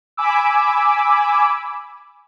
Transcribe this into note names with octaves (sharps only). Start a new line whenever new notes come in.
G#5 B5 D6 E6